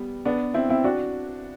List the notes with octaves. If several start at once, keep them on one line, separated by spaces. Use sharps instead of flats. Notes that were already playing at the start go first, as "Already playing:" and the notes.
Already playing: G3 B3
B3 D4
C4 E4
C4 E4
D4 F#4